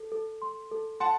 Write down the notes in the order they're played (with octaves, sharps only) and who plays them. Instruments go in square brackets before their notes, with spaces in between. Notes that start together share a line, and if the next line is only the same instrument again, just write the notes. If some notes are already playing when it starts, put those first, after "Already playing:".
Already playing: [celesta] A4
A4
C6
A4
[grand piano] F#5 A5 [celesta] C6